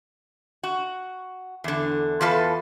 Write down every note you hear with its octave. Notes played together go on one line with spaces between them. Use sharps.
F#4
E2 D3
E2 F4 A4 B4